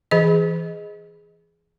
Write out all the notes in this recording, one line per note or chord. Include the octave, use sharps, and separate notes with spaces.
E3 G#4 D#5